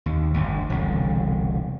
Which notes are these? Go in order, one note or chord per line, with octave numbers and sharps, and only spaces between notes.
D#2
G1 D2
E1 C2 D3